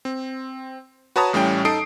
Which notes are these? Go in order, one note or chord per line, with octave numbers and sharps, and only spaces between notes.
C4
F#4 B4 C#5 A5 A#5 D#6
A1 A2 G3 C#4 G5
D#4 A4 D#6 C7 D7